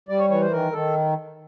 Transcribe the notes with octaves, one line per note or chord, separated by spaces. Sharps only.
G3 D5
C#5
E3 C#5
C5
D#3 A#4
D#3 A4